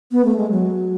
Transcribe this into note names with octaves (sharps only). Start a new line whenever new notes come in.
B3
A3
G#3
F#3